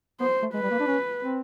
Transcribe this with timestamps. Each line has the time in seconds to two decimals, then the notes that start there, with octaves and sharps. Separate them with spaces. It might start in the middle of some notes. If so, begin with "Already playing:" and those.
0.20 B3 C5
0.42 A3
0.53 G#3 B4
0.63 G3
0.70 A#3
0.80 D4
0.87 C#4
1.21 C4